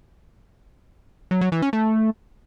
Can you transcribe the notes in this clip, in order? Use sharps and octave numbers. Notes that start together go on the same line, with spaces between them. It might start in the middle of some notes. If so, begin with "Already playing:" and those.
F#3
F#3
E3
C#4
A3